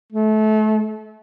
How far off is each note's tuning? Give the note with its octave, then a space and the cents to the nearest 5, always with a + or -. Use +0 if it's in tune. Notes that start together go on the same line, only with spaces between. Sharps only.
A3 -30